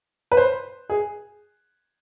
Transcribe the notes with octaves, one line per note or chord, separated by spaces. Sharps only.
B4
C5
G#4